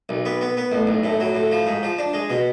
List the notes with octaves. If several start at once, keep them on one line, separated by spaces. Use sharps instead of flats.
B1
B3
B3
B3
A1
B1
A2
F#3
A2
F3
G#2
F3
D4
G#3
B2